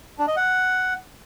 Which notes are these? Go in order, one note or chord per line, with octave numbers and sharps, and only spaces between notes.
D4
D#5
F#5